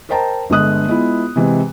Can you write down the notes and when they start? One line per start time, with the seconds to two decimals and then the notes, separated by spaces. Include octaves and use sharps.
0.09 A#4 C5 D#5 G5 A5 A#5
0.50 G1 D3 G#3 D#5 D#6 F#6
0.89 G#3 B3 E4 F4
1.36 C3 E3 G#3 C4